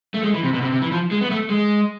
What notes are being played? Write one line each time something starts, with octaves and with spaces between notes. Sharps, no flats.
A3
G#3
E3
C3
B2
C3
C3
E3
F3
G#3
B3
A3
G#3